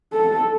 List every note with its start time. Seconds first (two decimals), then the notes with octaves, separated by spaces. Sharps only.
0.13 A4